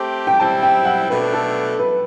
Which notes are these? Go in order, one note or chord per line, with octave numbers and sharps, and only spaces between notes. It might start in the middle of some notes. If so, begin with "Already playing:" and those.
Already playing: A3 C4 G4
G5
G3 C4 E4 A5
G5
F#5
B2 A3 D4 B4
A4
B4